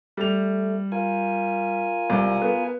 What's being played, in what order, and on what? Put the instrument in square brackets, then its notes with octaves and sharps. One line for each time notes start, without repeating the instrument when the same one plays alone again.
[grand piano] G3 F7 [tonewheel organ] A3
[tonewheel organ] F4 A#4 G#5
[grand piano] C2
B3